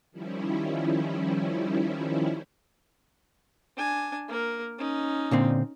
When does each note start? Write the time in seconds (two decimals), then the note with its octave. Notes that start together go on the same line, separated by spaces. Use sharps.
0.11 D#3 F3 G3 C#4 E4
3.76 D4 G#5
4.29 A#3 A#4
4.78 C#4 D#4
5.31 A#2 D3 C4